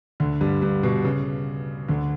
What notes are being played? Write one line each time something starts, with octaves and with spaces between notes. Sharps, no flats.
D2 D3
G2 G3
G2 G3
B2
C#3
D2 D3